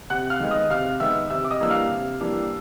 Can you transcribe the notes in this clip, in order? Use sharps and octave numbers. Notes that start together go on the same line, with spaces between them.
C3 F#5 F#6
F5 F6
D#3 G#3 B3
D#5 D#6
C3 F5 F6
D#3 G#3 B3 E5 E6
C3 E5 E6
D6
D#5 D#6
E3 G3 A#3 D4 E6
F5 F6
C3
E3 G3 A#3 D4